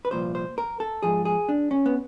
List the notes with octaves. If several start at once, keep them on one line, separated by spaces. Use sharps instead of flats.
B4
C2 A#2 F3 C5
C5
A#4
A4
G#2 F3 G#4
G#4
D4
C#4
B3